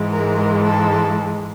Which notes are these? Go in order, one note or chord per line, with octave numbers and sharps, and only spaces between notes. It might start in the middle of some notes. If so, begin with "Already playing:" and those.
Already playing: G#2 E3 G#3
A#4
A4